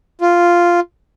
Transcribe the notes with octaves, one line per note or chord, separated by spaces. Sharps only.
F4